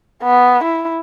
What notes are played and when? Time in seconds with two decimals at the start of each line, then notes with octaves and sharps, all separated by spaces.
0.23 B3
0.64 E4